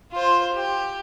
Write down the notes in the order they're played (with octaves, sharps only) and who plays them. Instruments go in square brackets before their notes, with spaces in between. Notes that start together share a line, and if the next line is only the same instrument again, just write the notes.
[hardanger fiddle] F4 C5
G4